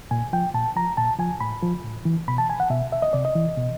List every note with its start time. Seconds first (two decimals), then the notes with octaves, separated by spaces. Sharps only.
0.11 A#2 G#5
0.33 F3 G5
0.54 A#2 A5
0.76 F3 A#5
0.97 A#2 A5
1.19 F3 G#5
1.41 A2 B5
1.62 F3
1.84 A2
2.05 E3
2.28 B2 B5
2.38 A5
2.50 G#5
2.60 F#5
2.70 B2 E5
2.92 E5
3.02 D#5
3.13 C3 D5
3.25 D#5
3.36 E3
3.57 B2